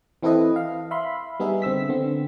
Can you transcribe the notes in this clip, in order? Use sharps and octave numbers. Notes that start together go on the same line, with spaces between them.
E3 C4 E4 A4 B4 D#5
F5
E5 F5 B5 C6
G3 B3 D#4 G#4 E5
D3 C4 E6 B6
D3 B3 C4